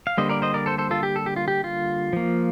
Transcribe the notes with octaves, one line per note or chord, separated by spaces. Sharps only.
F5
D3 G3 A#3 C5 D#5
A#4 D5
C5 D#5
A#4 D5
A4 C5
A4 C5
F4 A4
G4
A4
G4
F4
G4
F4
F3 A#3